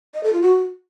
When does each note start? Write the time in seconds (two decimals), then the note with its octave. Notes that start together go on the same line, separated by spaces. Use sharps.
0.14 D#5
0.24 A4
0.33 F4
0.42 F#4